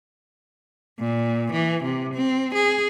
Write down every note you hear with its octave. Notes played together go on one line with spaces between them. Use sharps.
A#2
E3
C3
C4
G#4